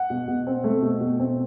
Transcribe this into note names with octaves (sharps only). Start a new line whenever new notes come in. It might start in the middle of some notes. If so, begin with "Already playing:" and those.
Already playing: F#5
B2
B2
C4
A3
B2
B2
C4